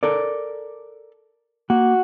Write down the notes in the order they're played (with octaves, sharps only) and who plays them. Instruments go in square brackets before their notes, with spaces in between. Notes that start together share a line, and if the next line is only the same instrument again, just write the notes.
[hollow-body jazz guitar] A4 A#4 D5
[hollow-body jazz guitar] A#3 [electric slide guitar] F#4